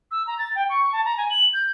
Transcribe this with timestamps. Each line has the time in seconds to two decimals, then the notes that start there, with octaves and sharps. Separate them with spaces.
0.11 E6
0.27 A#5
0.39 A6
0.55 G5
0.69 C#6
0.93 A5
1.05 A#5
1.18 G#5
1.30 F#7
1.53 G6